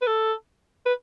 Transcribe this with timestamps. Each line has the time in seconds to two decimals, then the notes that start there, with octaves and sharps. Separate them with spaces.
0.01 B4
0.07 A4
0.86 B4